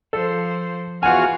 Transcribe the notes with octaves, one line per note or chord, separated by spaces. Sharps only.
F3 A4 C5
E2 F4 F#4 F#5 G#5 F6